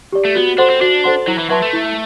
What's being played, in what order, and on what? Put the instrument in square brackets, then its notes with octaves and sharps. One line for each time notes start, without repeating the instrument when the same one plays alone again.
[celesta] G4 D5
[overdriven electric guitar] A3
[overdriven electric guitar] B3 [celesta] F#4
[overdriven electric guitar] D4 [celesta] A4 C5 F#5 C6
[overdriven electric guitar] C4
[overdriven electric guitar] D4 [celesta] F#4
[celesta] A4 C5 F#5 C6
[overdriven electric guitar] F#3 [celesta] E4
[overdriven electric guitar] E3
[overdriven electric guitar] F#3 [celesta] B4 E5 A5 C6
[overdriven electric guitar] A3
[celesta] E4